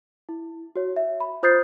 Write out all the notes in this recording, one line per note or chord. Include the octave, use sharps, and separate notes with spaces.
E4
F#4 C#5
E5
B5
F4 C5 D#6 G6 A6 C7